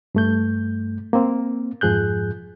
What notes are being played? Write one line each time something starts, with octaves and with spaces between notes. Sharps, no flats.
G2 A3 G6
A#3 C4
F2 G#2 F3 G#4 F#6 G6